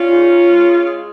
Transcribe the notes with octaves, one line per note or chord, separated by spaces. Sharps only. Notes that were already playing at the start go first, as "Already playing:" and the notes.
Already playing: G3 C#4 F4
G#2
G#2
G#3
G#3
G#3